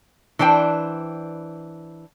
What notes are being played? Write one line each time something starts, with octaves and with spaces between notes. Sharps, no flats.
E3 D4 C5 G5